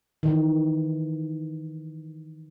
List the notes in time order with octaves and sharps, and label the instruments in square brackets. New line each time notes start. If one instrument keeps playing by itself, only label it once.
[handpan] D#3 E3